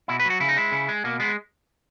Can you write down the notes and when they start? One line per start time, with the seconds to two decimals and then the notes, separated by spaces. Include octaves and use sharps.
0.08 B2 E4
0.20 B4
0.25 F#3
0.30 F#4
0.40 C#3 E4
0.49 D#4
0.57 G#3 E4
0.72 C#3
0.88 G#3
1.04 B2 A#3
1.20 G#3 B3